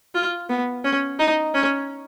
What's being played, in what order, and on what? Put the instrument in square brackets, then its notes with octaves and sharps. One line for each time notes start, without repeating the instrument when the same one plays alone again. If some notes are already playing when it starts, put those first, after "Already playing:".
[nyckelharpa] F4
B3
C#4
D#4
C#4